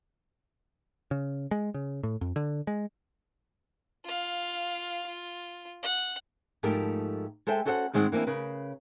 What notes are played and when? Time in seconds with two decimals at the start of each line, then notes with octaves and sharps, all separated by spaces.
1.11 C#3
1.51 G#3
1.74 C#3
2.03 A2
2.21 F2
2.36 D3
2.67 G#3
4.05 F4 F5
5.06 F4
5.82 F#5
6.63 G#2 F3 A3 G4 A#4
7.47 G#3 A4 C5 E5 G5 G#5
7.65 C#4 F#4 A4 C5 E5 F#5
7.93 G#2 D#3 G#3 C4 F#5
8.12 E3 A#3 C4 D4 E4
8.27 C#3 A#4 B4